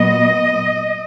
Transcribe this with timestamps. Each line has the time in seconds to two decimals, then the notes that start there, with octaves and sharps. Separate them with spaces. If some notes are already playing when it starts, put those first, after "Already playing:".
Already playing: A#2 F#3 B3 D#5